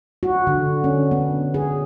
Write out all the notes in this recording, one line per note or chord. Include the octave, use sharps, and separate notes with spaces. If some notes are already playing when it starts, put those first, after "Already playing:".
F#4
D3
C#4
B3
G#4